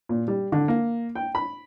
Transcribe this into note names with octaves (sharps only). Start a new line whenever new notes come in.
A#2
G3
D3
A#3
G5
B5